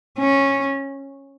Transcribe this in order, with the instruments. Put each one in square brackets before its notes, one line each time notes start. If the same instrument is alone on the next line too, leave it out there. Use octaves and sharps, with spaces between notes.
[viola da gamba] C#4